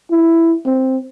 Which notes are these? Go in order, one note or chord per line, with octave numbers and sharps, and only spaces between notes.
E4
C4